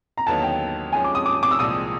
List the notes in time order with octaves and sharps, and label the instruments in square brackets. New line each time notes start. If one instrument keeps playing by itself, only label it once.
[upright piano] A#5
[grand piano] D#2 D3 F#3 B3 D#4 [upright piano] A5
[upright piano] G5
[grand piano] F3 G#3 C#4 [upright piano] G#5
[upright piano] D6
D#6
D6
D6
E6
[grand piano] C2 A#2 F3 G#3 C4 [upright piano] D#6